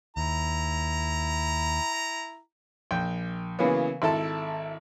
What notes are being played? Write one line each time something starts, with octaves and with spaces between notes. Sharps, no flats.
D#2 E4 A#5
A#1 G5
C#3 E3 F#3 A#3 B3
G#1 E4 A4 A5